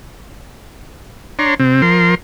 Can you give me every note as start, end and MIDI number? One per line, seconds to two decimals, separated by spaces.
1.39 1.54 62
1.39 1.54 73
1.39 1.54 82
1.39 1.54 84
1.60 1.82 48
1.60 1.82 60
1.82 2.15 53
1.82 2.15 70
1.82 2.15 84